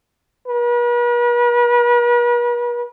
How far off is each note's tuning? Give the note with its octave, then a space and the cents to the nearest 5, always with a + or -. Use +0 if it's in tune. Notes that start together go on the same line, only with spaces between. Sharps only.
B4 -45